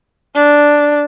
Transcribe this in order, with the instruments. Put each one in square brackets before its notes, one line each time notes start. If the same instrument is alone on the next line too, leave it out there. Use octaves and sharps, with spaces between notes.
[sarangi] D4